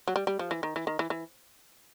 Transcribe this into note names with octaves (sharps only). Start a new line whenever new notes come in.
F#3
G3
G3
F3
E3
D#3
E3
D#3
E3
E3